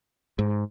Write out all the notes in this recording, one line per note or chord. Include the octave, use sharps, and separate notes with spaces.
G#2